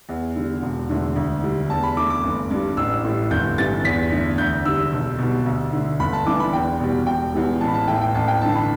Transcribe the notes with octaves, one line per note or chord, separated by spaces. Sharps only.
E2
D3 G3
E1
E2 D3 A3
D2
D3 G3
E2 A5
B5
D3 A3 D6
D6
G1
G2 G3
A1 E6
A2 G3
G1 G6
G2 E3 G3 A6
E2 B6
D3 A3
D2 G6
D3 G3 E6
B1
B2 G3
D2
D3 A3
G1 B5
A5
G2 E3 D6
B5
E2 G5
B2 G3
E1 G5
E2 E3 G3
A1 A5
B5
A5
A2 E3 G5
G5
A1 A5
G5
G2 D3 A5
B5